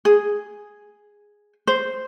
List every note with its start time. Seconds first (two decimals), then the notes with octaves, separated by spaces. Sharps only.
0.05 G#4
1.67 C5